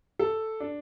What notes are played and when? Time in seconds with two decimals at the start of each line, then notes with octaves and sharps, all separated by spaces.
0.19 A4
0.60 D4